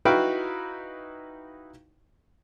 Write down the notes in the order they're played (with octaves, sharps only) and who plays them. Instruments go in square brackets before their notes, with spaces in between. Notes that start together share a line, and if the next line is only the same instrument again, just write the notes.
[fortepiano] D#4 E4 F#4 B4 F5 G5